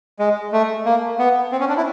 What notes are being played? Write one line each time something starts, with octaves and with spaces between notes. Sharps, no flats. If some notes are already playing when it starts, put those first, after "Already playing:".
G#3
A3
A#3
B3
C4
C#4
D4
E4